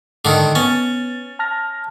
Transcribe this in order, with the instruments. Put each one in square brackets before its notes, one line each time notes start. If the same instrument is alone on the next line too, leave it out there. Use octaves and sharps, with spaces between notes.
[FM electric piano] G#2 [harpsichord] D3 D#3
[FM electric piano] B3 A6 [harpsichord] C#4
[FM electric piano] A5 F6 A#6